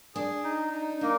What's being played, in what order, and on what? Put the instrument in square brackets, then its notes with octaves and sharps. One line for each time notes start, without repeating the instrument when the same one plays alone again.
[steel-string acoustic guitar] D4 [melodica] G#4
[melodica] D#4
D#4
[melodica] A#3 [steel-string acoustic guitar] D4